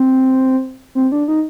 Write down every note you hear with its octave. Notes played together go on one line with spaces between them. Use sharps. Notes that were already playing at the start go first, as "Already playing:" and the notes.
Already playing: C4
C4
D4
D#4